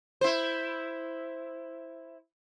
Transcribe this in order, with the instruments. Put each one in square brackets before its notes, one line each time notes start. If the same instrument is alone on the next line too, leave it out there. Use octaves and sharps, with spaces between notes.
[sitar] E4 C5